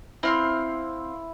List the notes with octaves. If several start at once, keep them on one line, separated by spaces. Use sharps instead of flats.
C4 E4 F5 C6